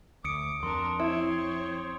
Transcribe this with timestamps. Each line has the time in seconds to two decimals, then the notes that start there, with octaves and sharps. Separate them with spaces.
0.24 D2 D6 D#6 C#7 D7
0.63 F2 D4 A#4 C6
1.00 C4 E4 C#5